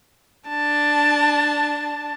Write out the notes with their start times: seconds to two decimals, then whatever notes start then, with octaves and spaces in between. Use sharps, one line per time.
0.48 D4 A5